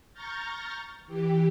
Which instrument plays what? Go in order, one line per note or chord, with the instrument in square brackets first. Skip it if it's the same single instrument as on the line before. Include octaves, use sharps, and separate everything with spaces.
[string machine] A#5 C#6 F6 G6 A6 A#6
E3 G4